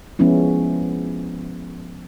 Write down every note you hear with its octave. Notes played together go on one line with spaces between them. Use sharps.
F3 G#3 B3 C#4 E4